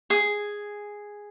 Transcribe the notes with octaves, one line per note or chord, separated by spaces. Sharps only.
G#4